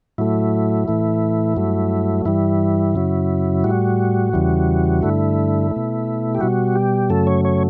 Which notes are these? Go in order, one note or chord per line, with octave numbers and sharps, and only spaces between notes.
A2 F#3 A3 E4
A2 E3 A3
G2 F#3 A3
G2 E3 G3 E4
F#2 C#3 F#3
A2 G3 F#4
E2 C#3 E3 G3
G2 D3 A3 E4
A3
B2
G4
B2 G3 F#4
G4
F#2 C#3 F#3 A3 A4
C#5
C#5